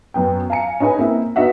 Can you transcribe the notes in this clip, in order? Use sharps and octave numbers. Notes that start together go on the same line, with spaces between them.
F#2 B3 G5
F5 G#5 A#5 C#7
C#4 D#4 G#4 B4 G#5
A#3 C4 E4
B3 D#4 F#4 E5 F#5